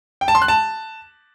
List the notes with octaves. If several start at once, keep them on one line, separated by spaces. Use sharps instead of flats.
G5
A5
C6
F#6
A5